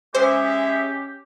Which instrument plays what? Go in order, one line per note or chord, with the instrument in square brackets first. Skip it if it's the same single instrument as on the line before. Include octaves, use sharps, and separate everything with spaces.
[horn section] G#3 E5 [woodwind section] C#4 G4 [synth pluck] C5